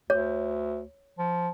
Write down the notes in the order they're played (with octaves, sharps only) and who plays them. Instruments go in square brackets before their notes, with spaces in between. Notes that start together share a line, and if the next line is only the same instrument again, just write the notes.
[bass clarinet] D2 [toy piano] C#5
[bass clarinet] F3